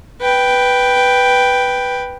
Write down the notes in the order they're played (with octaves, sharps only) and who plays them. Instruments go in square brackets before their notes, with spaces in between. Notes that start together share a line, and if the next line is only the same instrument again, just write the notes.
[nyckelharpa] B4 G5